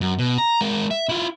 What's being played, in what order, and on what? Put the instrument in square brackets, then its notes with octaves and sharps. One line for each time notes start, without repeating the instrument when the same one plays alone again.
[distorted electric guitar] F#2
B2
A#5
G#3 A#4
E5
E4 F4